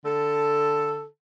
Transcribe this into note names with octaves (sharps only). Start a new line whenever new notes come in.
D3 A4